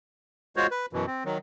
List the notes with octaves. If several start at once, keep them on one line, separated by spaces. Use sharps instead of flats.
G#3 F4 F#4 C5 C#5
B4
F#2 B2 E3
C4
D#3 F#3